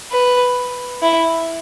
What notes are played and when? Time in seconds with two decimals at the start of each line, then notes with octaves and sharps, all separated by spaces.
0.11 B4
1.02 E4